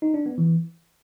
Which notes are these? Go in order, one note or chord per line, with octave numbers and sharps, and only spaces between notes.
D#4
D4
B3
E3